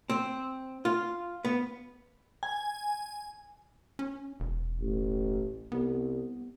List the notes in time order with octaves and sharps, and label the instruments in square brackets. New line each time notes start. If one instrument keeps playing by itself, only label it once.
[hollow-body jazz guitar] C4
F4
B3
[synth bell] G#5
[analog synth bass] C#4
E1
[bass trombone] A1
[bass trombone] C2 [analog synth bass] B3